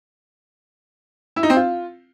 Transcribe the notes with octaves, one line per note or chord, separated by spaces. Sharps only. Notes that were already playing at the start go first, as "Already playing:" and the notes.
E4
D#4
C4
F4